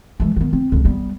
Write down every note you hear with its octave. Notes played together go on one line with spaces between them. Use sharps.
E3 G#3
D#3 B3
C4
C#2 D3
G3 B3